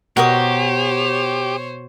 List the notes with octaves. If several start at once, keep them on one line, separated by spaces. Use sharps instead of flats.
B2 F#4 G4 A#4 C5 C#5 D#6